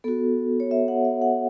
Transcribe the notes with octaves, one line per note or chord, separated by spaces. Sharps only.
B3 F#4 A4
C#5
E5
F#5
E5
F#5